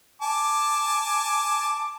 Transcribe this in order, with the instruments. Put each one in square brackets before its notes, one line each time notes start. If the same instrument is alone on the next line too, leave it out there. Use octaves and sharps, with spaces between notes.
[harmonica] G#5 A5 D6